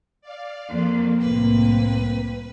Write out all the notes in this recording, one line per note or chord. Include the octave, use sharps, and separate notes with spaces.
D5 F5
F2 A#3
C2 A2 C4 B4